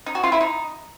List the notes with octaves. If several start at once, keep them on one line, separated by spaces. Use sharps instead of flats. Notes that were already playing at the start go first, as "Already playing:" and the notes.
D#4
F#4
F4
E4
D#4